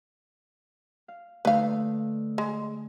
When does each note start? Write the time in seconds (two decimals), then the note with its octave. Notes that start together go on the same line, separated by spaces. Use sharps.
1.08 F5
1.45 D3 A3 D#4 B4 F5
2.38 G#3